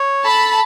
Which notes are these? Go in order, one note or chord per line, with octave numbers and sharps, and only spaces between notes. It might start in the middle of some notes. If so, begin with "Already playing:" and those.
Already playing: C#5
A4 A5 B5